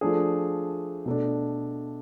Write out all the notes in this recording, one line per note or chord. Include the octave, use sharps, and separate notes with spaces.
F3 A3 D4 G#4
B2 A3 D4